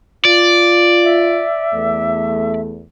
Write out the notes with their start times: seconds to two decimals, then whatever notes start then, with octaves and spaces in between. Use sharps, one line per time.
0.25 F4 D5
1.04 E5
1.74 E2 A3